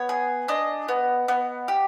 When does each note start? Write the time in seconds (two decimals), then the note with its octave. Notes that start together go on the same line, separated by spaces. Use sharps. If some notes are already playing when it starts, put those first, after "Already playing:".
Already playing: B3 C#5
0.09 G#4
0.48 D4 D#5
0.88 B3
1.28 B3
1.68 G4